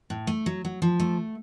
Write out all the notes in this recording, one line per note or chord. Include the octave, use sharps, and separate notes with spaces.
A2
A3
F#3
F#3
F3
A3